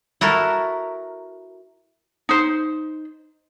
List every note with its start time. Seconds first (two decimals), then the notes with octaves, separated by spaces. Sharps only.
0.21 E4 F#4 A4 A#4
2.29 D#4 C5